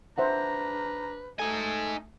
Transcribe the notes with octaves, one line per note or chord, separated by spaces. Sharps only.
D4 B4 C5 E5 F#5 A#5
A3 D#4 A4 G#5